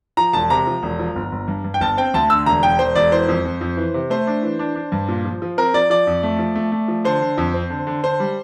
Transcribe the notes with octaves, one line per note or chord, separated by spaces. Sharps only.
F3 A#5
E1 A5
C3 A#5
F3
E1
F3
G1
G1
G2
G2
G5
G1 A5
C4 G5
D2 A5
D3 E6
E1 A#5
E1 G5
E1 C5
E1 D5
E3 C5
F2
F2
F2
E3
C3
A3 C5
D4
E3
D4
D4
G2
A#2
F3
F3
C4 A#4
F3 D5
F3 D5
F2
A3
F3
A3
A3
F3
D3 C5
D3
F2
C4
D3
D3
D3 C5
G3